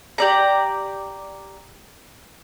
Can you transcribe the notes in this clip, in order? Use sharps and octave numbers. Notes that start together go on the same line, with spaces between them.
G4 D5 A#5